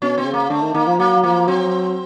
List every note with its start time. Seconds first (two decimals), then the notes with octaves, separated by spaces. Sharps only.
0.02 B2 C#4
0.18 C4
0.25 C#3
0.34 A#3
0.50 D3 A3
0.62 D#3
0.74 D#3 A#3
0.87 F3
0.99 F#3 A#3
1.23 F3 A#3
1.48 F#3 C4